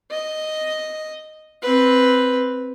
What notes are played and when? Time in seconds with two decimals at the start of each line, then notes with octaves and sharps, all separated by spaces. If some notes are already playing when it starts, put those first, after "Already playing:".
0.11 D#5
1.62 C4 B4